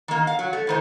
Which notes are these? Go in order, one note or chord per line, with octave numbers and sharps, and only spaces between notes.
D#3 A#3
F5
F#3
A3
A2 D#3 C5